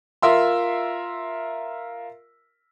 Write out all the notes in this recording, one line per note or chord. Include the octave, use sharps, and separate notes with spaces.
F4 A#4 E5 C6